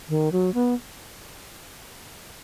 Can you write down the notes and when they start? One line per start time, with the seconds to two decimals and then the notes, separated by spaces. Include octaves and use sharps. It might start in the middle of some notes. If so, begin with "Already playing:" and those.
0.09 D#3
0.32 F#3
0.54 B3